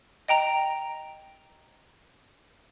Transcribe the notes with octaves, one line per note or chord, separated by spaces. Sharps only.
D#5 G5 A#5 F7